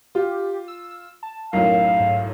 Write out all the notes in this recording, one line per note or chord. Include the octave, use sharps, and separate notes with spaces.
F4 G4
E6
A5
B1 F#2 A2 A#4 F5
G#2